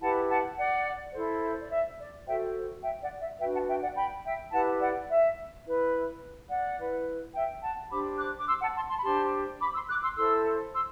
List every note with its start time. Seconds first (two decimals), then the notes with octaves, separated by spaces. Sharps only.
0.01 E4 G4 B4 F#5 A5
0.29 F#5 A5
0.57 D5 F#5
1.13 E4 A4 C5
1.61 D5
1.71 E5
1.99 D5
2.26 F#4 A4 C5 E5 G5
2.83 E5 G5
3.02 D5 F#5
3.20 E5
3.39 D4 F#4 B4 E5 G5
3.53 F#5 A5
3.68 E5 G5
3.81 D5 F#5
3.95 G5 B5
4.24 E5 G5
4.52 E4 G4 B4 F#5 A5
4.80 D5 F#5
5.09 E5
5.65 E4 B4
6.49 D5 F#5
6.78 E4 B4
7.34 E5 G5
7.63 F#5 A5
7.91 D4 G4 C5 B5 D6
8.18 D6 F#6
8.38 D6
8.48 C6 E6
8.61 F#5 A5
8.76 A5 C6
8.89 A5 C6
8.98 B5
9.04 D4 G4 C5 A5 C6
9.60 B5 D6
9.74 C6 E6
9.88 D6 F#6
10.02 C6 E6
10.16 E4 A4 C5 C6 E6
10.72 C6 E6